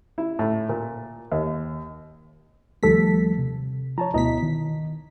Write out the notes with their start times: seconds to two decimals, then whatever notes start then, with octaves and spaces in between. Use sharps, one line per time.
0.18 E4
0.39 A2
0.69 A#2
1.32 D#2
2.83 D#2 F3 G3 A3 A4 B6
3.38 C3
3.98 F3 C#5 A5 A#5
4.14 D2 B2 E4 D#5 A#5 B6
4.43 D#3